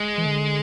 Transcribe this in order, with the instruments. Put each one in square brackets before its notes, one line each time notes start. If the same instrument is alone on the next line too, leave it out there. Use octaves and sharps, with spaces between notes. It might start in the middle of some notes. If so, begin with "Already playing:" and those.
Already playing: [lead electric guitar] G#3
[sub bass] E3
D3